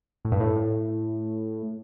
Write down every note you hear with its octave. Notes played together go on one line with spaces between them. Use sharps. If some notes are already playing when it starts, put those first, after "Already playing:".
A2
G2
A2